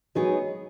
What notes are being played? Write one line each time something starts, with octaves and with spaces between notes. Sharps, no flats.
F#3 G#3 B3 D#4 G#4 C#5